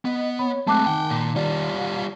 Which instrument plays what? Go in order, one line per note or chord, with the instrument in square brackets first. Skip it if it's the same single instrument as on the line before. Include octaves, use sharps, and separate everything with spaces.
[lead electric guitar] B3 [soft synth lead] D#5
[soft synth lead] C#5 [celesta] B5
[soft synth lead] G#3 [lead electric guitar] A3 C4 [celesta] A5 D6 F#6
[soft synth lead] D#3 [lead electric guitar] F#5 G5
[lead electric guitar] A#2
[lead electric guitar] G3 F4 [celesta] D5